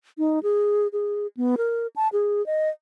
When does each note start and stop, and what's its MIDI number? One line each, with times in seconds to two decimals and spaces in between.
0.18 0.39 63
0.43 0.87 68
0.93 1.27 68
1.37 1.55 59
1.58 1.87 70
1.96 2.08 81
2.13 2.45 68
2.46 2.69 75